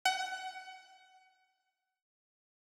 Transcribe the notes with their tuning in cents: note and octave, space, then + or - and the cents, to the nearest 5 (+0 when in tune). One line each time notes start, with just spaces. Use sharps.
F#5 +25